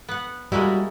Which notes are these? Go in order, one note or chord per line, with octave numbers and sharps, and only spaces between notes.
B3 F#5
G3 G#3 A#3 E4 F#4